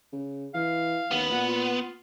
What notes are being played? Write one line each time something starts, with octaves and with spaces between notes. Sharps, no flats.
C#3
E3 F5
D#2 B3
A#2 F#5
F4